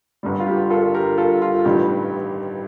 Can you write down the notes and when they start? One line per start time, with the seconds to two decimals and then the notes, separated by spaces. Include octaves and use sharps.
0.23 G1 G2 D3 G3
0.40 F4
0.47 G4
0.70 F4 A4
0.82 A4
0.94 G4 A#4
1.18 F4 A4
1.42 F4
1.65 A1 G2 D#3 G3 G4